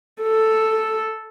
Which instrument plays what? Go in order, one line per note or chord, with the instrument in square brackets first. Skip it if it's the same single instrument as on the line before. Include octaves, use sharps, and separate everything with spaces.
[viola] A4